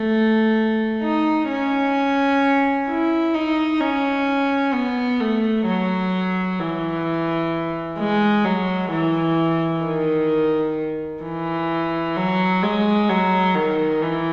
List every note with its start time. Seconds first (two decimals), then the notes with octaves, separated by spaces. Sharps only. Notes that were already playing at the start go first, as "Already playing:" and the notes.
Already playing: A3
1.02 D#4
1.49 C#4
2.89 E4
3.34 D#4
3.80 C#4
4.73 B3
5.20 A3
5.66 F#3
6.60 E3
7.98 G#3
8.45 F#3
8.92 E3
9.84 D#3
11.24 E3
12.16 F#3
12.63 G#3
13.09 F#3
13.55 D#3
14.02 E3